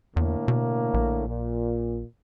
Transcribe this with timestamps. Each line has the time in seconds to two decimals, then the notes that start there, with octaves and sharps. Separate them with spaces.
0.16 E2 A2 D3 A#3
0.48 B2
0.94 A#1
1.27 A#2